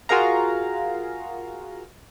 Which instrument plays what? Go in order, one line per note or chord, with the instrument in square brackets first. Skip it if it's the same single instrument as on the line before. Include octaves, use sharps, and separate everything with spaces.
[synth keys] F4 F#4 G#4 A#4 F5 A#5